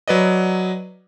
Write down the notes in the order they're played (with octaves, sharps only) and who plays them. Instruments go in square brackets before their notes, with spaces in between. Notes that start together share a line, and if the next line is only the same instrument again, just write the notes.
[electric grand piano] F#3 B4 D5 D#5